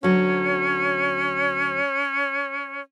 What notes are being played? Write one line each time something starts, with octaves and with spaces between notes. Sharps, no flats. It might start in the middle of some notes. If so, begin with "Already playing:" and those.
D2 F#3 C#4 C#5